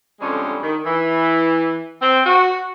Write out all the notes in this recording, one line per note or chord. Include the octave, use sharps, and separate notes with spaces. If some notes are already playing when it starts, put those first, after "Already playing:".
F2 D3 G3 G#3 C#4
D#3
E3
C4
F#4